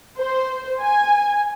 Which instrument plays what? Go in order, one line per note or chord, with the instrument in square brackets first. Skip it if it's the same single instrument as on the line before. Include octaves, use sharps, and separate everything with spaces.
[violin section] C5
G#5